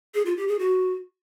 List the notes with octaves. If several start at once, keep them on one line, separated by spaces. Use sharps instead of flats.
G#4
F4
G4
G#4
F#4